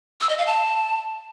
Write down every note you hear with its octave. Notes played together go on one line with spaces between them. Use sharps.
E6
D#5
F5
A5